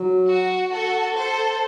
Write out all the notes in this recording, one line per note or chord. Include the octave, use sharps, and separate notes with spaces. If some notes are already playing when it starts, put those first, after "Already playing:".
Already playing: F#3
F#4
F#4 A4
A4 C5